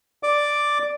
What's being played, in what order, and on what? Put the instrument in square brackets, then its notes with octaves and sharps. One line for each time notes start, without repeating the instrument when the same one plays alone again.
[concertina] D5 D6